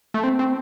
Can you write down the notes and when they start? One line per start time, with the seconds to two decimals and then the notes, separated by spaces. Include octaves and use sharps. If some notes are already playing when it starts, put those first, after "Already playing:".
0.14 A3
0.24 C4
0.39 C4